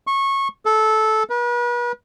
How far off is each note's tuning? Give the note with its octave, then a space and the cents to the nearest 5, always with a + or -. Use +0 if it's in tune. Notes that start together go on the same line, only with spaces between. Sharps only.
C#6 -20
A4 -15
B4 -40